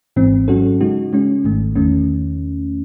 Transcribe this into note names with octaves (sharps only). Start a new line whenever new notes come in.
G#1 G#2 E3 C4
G#2 F#3 C#4 F#4 A4
C#3 G#3 D#4 F#4
C#3 G#3 C#4
G#1 G#2 D#3 A3
E2 D#3 A3 C#4